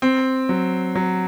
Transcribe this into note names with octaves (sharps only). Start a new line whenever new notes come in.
C4
F#3
F#3